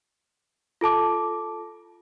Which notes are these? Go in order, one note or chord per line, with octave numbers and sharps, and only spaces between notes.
F4 A4 A5 D6